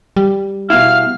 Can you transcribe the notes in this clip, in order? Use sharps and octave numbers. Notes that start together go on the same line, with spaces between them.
G3
B2 E4 F5 F6